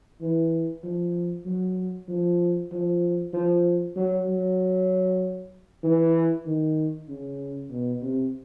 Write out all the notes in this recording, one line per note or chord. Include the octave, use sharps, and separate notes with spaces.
E3
F3
F#3
F3
F3
F3
F#3
F#3
E3
D#3
C#3
B2
C3